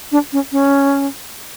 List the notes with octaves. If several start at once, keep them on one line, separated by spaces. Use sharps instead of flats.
D4
C#4
C#4